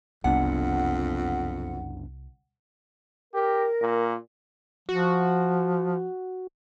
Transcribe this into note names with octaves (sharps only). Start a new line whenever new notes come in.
F#1 C2 F2 B3 D4 F#5
G4 A#4
A#2
F3 F#4